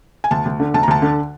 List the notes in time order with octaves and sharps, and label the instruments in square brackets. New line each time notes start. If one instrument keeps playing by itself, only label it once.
[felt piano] G#5
D2 A5
D2
D3
D2 A5
A#5
D2 A5
D3